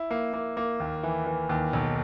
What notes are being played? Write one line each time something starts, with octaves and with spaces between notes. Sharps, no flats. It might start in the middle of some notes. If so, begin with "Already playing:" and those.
Already playing: E4
A#3
A#3
A#3
D#2
E3
E3
D#2
B1